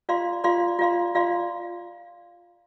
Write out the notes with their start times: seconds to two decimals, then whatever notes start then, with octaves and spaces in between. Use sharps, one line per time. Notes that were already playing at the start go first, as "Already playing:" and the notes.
0.09 F4 D5 F5 C6
0.44 F4 D5 F5 C6
0.79 F4 D5 F5 C6
1.15 F4 D5 F5 C6